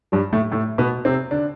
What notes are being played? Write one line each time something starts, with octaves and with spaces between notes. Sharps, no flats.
G2 G3
A2 A3
A2 A3
B2 B3
C3 C4
D3 D4